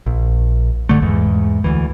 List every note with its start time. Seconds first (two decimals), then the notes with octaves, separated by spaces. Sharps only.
0.06 A#1
0.89 G1 E2 D3 A3
1.02 E2 G#2
1.64 D2 E3